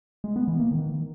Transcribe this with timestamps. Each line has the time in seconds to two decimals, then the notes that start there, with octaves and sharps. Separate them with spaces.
0.24 G#3
0.36 B3
0.48 E3
0.60 A#3
0.71 D#3